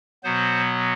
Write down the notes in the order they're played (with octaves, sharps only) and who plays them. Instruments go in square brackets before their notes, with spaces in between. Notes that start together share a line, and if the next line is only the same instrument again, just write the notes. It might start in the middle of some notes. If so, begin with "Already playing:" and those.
[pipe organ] B2 F#3 B3 C5